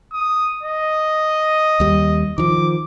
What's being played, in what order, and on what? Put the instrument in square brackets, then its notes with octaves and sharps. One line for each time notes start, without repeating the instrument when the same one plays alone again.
[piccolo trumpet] D#6
D#5
[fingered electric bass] D#2 G3
[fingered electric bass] D#3 F3 [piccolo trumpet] D6